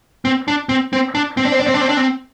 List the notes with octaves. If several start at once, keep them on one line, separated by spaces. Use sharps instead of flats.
C4
D4
C4
C4
D4
C4
D4
C4
D4
C4
D4
C4
D4
C4